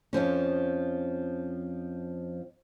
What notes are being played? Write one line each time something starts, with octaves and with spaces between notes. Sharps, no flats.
F2 G#2 F3 C#4